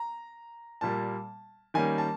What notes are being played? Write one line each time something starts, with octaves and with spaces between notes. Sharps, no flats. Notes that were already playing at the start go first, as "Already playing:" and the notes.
Already playing: A#5
A#2 G3 A#3 A5
D#3 G3 A#3 C#4 G#5
A5